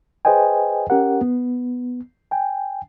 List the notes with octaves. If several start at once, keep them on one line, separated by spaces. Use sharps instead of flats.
G#4 B4 C5 D#5 G5 G#5
C#4 G4 A#4 F#5
B3
G5 G#5